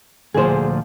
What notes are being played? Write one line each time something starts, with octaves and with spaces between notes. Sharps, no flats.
D2 A#2 F3 G#4 C5